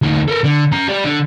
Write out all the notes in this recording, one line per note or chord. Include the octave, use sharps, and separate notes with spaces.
D2 D#4
A4 A#4
D3
C#4 A#5
G4 D5
D3